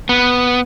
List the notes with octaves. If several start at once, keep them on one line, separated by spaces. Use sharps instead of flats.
B3